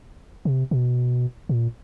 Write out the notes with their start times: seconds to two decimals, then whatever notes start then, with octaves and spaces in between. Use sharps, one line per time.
0.45 C3
0.71 B2
1.49 A#2